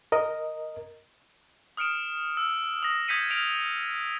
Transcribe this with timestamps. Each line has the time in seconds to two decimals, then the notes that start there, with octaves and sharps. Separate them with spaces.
0.12 A#4 D#5
1.77 D#6 F6 C#7 D7 E7
2.37 E6
2.82 D#6 A#6
3.08 D#6 G6 G#6 B6 C#7 D#7
3.30 F6 A#6 D7 F7